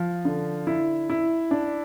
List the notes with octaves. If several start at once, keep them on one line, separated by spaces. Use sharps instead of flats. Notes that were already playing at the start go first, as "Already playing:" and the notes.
Already playing: F3
D3
E4
E4
D4